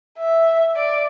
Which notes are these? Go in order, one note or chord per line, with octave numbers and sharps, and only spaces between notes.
E5
D5